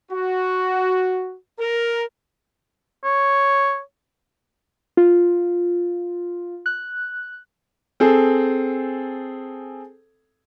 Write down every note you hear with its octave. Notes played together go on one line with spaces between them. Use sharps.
F#4
A#4
C#5
F4
F#6
C4 G#4 A4